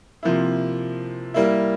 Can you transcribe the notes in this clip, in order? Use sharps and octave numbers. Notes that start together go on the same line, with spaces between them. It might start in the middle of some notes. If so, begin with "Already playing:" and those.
C3 F3 A#3 E4
G3 A#3 E4